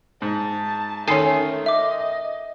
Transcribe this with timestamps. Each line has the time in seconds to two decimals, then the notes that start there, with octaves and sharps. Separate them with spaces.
0.22 G#2 A5
1.08 D#3 A3 C#4 A4 G#5 C6 C7
1.66 D#5 E5 D6